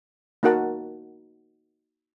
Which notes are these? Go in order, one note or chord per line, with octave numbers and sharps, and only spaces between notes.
A#3 D#4 F#4 A#4 F#5 A5